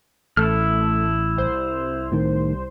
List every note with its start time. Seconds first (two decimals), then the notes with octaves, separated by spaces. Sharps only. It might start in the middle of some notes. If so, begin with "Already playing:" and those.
0.37 A1 A3 E4 A4 F6
1.36 C2 C5
2.12 A2 D#3